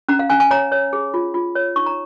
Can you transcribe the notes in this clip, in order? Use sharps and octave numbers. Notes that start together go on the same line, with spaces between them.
C#4 A#5
F5
C#4 G#5
G#5
C#5 A#5
C#5
G#4
F4
F4
C#5
D#4 C#6
A#5